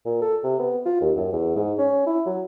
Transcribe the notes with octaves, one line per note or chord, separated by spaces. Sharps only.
A#2
A4
C3
B3
F4
D#2
F#2
E2
G#2
C#4
E4
F#3